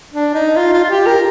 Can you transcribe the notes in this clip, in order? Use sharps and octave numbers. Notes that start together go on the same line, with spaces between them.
D4
D#4
F4
F4
F4
G4
A#4